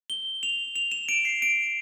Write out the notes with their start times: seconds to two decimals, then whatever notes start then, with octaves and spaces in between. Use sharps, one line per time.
0.10 G7
0.43 F7
0.76 F7
0.92 E7
1.09 D7
1.25 C7
1.42 D7